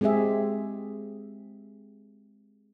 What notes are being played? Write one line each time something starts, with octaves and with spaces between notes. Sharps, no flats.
G#3 C4 G4 G#4 E5